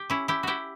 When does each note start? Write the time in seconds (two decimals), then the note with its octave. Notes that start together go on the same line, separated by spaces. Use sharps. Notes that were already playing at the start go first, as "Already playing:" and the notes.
Already playing: G4
0.10 C#4 E4
0.28 E4 G4
0.43 E4 F#4 G4